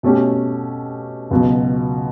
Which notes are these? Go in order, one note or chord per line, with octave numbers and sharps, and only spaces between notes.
B2 A3 C#4 G4
C#2 B2 F#3